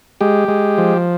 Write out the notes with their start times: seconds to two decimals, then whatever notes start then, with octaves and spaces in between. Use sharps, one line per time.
0.21 G#3 G4
0.48 G#3
0.78 F3